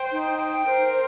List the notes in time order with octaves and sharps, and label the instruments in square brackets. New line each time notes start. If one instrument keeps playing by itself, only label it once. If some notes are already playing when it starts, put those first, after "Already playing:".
Already playing: [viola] C5 [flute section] G5
[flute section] D#4
G5
[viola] A#4 [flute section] C5
[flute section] C5